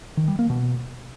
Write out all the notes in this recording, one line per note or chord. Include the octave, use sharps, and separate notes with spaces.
D#3
G3
A#3
B2